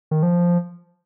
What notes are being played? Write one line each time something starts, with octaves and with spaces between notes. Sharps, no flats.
D#3
F3